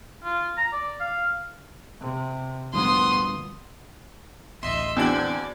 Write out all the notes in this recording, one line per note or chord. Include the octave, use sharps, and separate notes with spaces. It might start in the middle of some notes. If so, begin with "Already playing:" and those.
F4
A#5
D5
F5
C3
D2 G2 A#2 F3 B3 C6 D#6
A1 D2 D#5 E5 C6
E2 C4 D4 F#4 D5 G#6 F#7